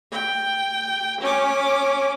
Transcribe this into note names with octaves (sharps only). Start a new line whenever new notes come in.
G5
C#4 D6